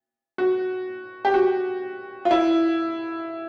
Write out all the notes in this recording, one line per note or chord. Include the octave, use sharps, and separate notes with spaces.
F#4
G4
F#4
F4
E4